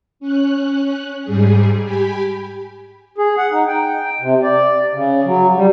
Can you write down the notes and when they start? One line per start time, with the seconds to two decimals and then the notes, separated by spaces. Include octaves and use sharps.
0.20 C#4 F#6
1.24 G#2 G3 G#4
1.83 G4 G#5 B5
3.18 G#4
3.38 F#5
3.52 D#4
3.68 G5
4.21 C3
4.43 D5
4.94 C#3
5.25 F#3
5.56 G3